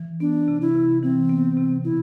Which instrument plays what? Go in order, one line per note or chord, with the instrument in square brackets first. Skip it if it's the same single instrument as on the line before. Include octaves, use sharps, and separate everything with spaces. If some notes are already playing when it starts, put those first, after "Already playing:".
Already playing: [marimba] E3
[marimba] B3 [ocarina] D4
[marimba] C3
[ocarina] E4
[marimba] C3
[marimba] E3 [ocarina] C4
[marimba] B3
C3
[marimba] B2 [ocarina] E4